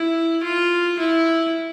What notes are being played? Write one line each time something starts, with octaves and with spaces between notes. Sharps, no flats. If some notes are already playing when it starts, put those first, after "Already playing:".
Already playing: E4
F4
E4